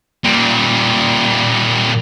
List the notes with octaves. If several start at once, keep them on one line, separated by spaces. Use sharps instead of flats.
A#2 G3